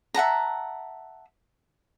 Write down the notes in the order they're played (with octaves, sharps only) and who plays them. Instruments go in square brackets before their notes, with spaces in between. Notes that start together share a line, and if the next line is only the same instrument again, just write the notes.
[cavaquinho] E5 F#5 A5 A#5